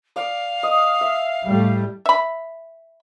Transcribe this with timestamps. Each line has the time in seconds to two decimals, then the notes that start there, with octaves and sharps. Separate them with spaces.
0.16 D5 F5
0.63 D#5
1.01 E5
1.47 A2 G3 A3
2.06 E5 B5